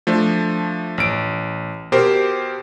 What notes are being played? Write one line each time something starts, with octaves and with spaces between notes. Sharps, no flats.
F3 A3 D4
A1 D7
B2 G4 A#4 C5